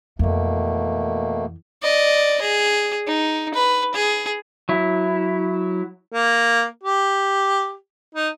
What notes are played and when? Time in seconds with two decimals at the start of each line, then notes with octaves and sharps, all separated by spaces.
0.19 F2 B2 E3 A3 A#3
1.82 D5 D#5
2.41 G#4
3.07 D#4
3.54 B4
3.94 G#4
4.69 F#3 E4
6.12 A#3
6.83 G4
8.15 D#4